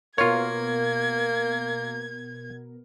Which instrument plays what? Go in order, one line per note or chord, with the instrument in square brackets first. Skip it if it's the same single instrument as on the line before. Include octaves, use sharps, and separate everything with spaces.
[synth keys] B2 B3 A#4 [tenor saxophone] A#3 [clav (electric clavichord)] F4 C#5 [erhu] G#6